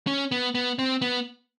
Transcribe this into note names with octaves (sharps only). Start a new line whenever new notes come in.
C#4
B3
B3
C4
B3